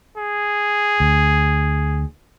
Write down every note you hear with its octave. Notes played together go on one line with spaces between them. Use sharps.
G#4
D2